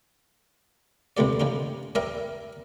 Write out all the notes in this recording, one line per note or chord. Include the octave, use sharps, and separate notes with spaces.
C#2 C3 A3 G4 D5
C#3 D#4 G4
G3 G4 A#4 E5 G5 A#5